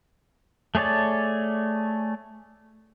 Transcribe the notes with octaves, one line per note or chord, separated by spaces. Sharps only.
A3 G#4 C#5 D5 A5